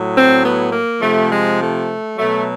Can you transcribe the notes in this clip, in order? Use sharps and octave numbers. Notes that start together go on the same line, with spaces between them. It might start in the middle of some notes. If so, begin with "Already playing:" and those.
Already playing: A2 F#3
C4
B3
A#3
C3 F3 A3
G#3
A3
B2 F#3 A3